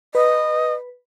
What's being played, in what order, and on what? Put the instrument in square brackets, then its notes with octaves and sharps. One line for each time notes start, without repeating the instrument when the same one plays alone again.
[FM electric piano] B4 [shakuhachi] D#5